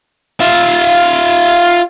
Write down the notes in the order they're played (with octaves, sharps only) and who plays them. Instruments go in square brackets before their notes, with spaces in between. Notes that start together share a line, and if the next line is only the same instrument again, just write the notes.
[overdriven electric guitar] F4 E5